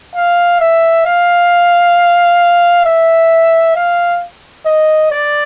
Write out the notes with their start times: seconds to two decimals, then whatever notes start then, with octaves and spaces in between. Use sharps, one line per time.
0.15 F5
0.61 E5
1.06 F5
2.85 E5
3.75 F5
4.66 D#5
5.11 D5